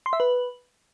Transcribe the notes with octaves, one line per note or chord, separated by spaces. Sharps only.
C6
E5
B4